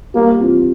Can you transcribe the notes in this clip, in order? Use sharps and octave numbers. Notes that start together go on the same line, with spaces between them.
G3 A#3
C4 F4